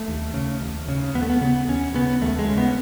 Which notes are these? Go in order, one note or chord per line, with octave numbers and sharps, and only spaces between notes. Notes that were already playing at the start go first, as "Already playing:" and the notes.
Already playing: A3
D#2
C#3
D#2
C#3
D#2 B3
A3
B3
C#3 B3
D#2 C#4
C#3 B3
D#2 A3
G#3
C#3
B3